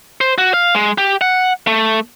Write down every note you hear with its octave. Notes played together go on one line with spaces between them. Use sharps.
C5
F#4
F5
G#3
G4
F#5
A3